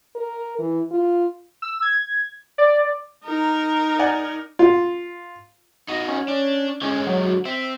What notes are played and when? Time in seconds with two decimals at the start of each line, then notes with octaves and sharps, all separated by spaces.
0.15 A#4
0.59 E3
0.91 F4
1.62 E6
1.82 G#6
2.58 D5
3.25 D#4 A#4
3.99 D5 F#5 G#5
4.59 F4
5.88 D#4 F#4 D#5
6.08 C#4
6.28 D4
6.81 D3 G#3 C#4
7.07 F#3
7.45 C4 E5